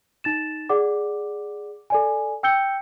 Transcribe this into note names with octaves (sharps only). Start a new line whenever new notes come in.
D#4 A6 E7
G#4 D5 F#5 D6
A4 D5 G#5
G5 E6 G6 C#7 G7